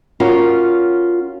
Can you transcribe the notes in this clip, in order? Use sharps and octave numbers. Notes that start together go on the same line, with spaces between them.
C#4 F4 F#4 A#4